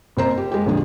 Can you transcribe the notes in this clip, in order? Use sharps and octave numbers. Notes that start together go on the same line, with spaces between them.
F#1 C4 C5 A#5
G4
G#3 G4
A#1 F2 D3 G#4